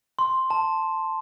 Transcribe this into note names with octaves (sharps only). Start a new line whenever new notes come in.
C6
A5